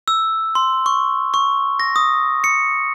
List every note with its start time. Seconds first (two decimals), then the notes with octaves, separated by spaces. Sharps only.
0.08 E6
0.55 C6
0.86 C#6
1.34 C#6
1.80 A#6
1.96 D#6
2.44 C#7